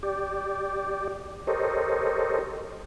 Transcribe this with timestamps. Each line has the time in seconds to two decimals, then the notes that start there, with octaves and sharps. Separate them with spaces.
0.03 G4 D5
1.47 G4 A4 A#4 C5 C#5 D#5